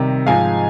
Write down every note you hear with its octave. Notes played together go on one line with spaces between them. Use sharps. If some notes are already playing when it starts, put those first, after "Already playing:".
Already playing: C3 D#3 G3 A#5
G#2 F3 G#3 F5 G#5